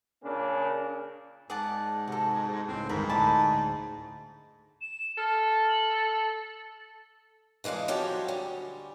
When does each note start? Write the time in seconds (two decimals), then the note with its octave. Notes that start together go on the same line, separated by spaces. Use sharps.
0.23 A#2 C#3 A#3 C#4 D4
1.50 G#2 G#4 D5 F#5 A5
2.08 C3 F#4 A4
2.68 C#2 A2 C4
2.89 G1 G#2 D#3 B3 A#4 B5
3.09 D2 A2 D5 D#5 A5 B5
4.81 E7
5.18 A4 F6
5.69 F#7
5.95 A6
7.64 C#3 E3 G#3 D4 F5
7.88 F3 F#3 G4 A4 C#5
8.28 D2 G3 C#4